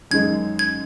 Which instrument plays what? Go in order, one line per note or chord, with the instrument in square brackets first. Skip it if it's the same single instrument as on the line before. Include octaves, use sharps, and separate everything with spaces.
[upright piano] F#2 D#3 G#3 D#4 [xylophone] G#6
[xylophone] G#6